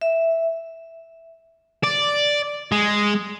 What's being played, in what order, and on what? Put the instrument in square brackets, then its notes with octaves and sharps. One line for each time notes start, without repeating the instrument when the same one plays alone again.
[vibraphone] E5
[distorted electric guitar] D5
G#3